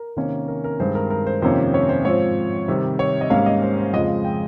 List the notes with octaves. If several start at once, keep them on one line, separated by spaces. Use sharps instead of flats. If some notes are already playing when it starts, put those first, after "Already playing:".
Already playing: A#4
C3 D#3 A#3 C#4
A#4
A#4
G2 D#3 G#3 C4 C5
A#4
A#4
C5
F2 C3 D#3 A#3 C#4 C5
C#5
C5
G#2 F3 C4 C#5
C3 D#3 G3
C#5
D#5
G#2 G3 A#3 C#4 F5
D#5
C5
C5
F2 C#3 F3 G#3 D#5
G5